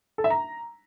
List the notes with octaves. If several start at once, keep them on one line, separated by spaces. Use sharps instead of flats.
A4
E5
A#5